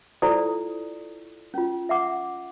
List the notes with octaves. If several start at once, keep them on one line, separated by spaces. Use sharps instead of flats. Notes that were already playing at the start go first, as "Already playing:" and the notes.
E4 F4 A4 C5 D5 D#6
C#4 F4
E5 F#5 D6